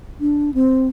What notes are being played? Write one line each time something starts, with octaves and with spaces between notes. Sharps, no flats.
D4
C4